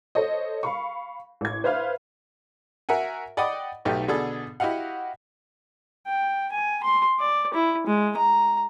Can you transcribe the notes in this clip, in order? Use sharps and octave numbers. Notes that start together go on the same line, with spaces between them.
A4 C5 C#5 D#5
F5 B5 C#6
A1 G#6
B4 C5 E5 F5 F6
F#4 A#4 E5 F#5 G#5
D5 D#5 F#5 G5 B5 D#6
B1 A3 D#4 G4
B2 D3 D4 G#4 A4
E4 F#4 G4 D#5 F5 F#5
G5
G#5
C6
D5
E4
G#3
A#5